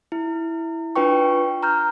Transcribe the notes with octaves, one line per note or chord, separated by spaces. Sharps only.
E4
D4 F4 B4 G5 C#6
A#5 F6 G6